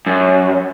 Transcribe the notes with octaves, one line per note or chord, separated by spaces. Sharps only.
F#2